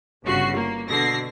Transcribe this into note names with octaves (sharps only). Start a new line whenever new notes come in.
G1 C#3 F#4 C7
A#3
B2 D3 A#6 C7